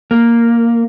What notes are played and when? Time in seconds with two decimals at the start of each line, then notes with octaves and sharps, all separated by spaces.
0.11 A#3